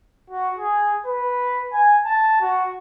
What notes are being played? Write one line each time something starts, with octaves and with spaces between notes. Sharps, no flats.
F#4
G#4
B4
G#5
A5
F#4